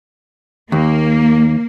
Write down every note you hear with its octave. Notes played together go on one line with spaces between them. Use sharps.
D#2 A#3